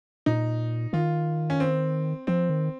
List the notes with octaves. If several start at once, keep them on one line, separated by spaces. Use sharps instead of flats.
A#2 D#4
D#3 F4
C#4
C4
F3 C4
D#3